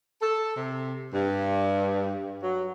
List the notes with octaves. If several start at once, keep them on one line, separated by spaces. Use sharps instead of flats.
A4
C3
G2
F#3